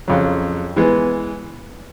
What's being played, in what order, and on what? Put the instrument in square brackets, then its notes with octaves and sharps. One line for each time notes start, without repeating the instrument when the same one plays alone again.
[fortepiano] F2 C#3 F#3
E3 G#3 B3